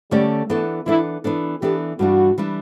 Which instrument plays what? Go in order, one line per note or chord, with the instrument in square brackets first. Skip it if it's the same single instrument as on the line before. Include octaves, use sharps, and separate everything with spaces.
[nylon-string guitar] D3 A3 C#4 G4 D5 [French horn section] G3
[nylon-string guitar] E3 B3 D4 A4 [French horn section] A3
[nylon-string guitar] E3 B3 D4 A4 [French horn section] E4
[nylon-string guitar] E3 B3 D4 A4
[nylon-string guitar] E3 B3 D4 A4 [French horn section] G4
[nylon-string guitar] G2 E3 G3 D4 [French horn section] F#4
[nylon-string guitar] E3 G3 D4